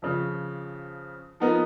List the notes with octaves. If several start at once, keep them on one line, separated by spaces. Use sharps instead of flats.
F2 C#3 F3
F3 B3 D#4 A#4